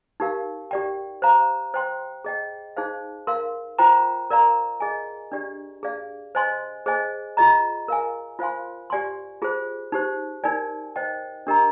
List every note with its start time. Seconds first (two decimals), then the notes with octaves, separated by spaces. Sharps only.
0.20 D#4 G4 A#4 F5
0.71 G4 D5 G5
1.22 C5 F5 A#5
1.74 C5 G5 C6
2.24 G#4 D#5 G5
2.77 D#4 G#4 C5 F5
3.27 A#4 F5 C6
3.79 F4 C5 G5 A#5
4.30 A#4 D5 F5 A#5
4.80 G#4 D#5 G#5
5.32 D4 G4 D5
5.83 G#4 D5 F5
6.35 C5 D#5 G#5 C6
6.86 G#4 C5 D#5 G#5
7.37 F4 G#4 D#5 A#5
7.88 A#4 F5 G#5
8.39 F4 C5 F5 G#5 C6
8.90 G4 D5 G#5 C6
9.42 F4 G#4 C5
9.92 D#4 G4 C5
10.44 D#4 A#4 D5 G#5
10.96 C5 D#5 G5
11.47 D4 G4 A#4 D#5 A#5